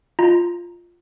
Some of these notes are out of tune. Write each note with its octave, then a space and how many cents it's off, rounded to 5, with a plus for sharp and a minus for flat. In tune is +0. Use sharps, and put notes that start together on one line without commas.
F4 +0 D#5 +0 A#5 +0